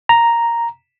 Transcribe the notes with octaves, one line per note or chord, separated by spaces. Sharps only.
A#5